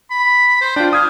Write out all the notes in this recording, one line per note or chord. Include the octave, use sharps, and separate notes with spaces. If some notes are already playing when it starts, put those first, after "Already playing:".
B5
C5
D4 F4 G5
F5 D#6 G#6